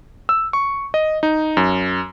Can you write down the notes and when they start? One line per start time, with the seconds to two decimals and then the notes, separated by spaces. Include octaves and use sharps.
0.29 E6
0.53 C#6
0.94 D#5
1.23 D#4
1.57 F#2